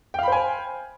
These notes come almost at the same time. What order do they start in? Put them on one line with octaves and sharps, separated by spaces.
G5 F5 B5 C5 G#5